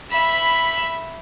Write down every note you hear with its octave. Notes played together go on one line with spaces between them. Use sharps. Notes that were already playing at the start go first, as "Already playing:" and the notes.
E5 B5